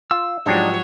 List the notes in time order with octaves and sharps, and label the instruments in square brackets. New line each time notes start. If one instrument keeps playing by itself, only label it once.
[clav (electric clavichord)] F4 [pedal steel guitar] E6
[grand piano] G#2 F3 G4 [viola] F#3 C#5 [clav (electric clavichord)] G#3 D4 D#4